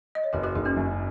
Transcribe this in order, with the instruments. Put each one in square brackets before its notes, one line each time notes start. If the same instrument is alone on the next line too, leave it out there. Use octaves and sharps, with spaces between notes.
[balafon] D#5
C#5
[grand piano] F#1 [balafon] F#4 B4
[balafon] F#4 B4
[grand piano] F#1 [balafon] D#4 G#4
[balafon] C#4 F#4
[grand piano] F#2